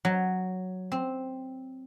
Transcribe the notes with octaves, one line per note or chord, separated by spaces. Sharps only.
F#3
C4